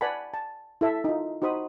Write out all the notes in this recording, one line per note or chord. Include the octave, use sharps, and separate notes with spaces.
B4 D5 F#5 G#5 A5 B5
A5
E4 A4 E5
D#4 F4
D#4 F#4 C5 B5 D#6